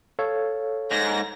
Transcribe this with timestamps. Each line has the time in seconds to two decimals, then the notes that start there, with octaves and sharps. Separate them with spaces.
0.19 A4 C#5 F5
0.91 G#2 A#6